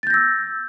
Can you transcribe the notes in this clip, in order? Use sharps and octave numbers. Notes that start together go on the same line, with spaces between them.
E6 G6 A6 A#6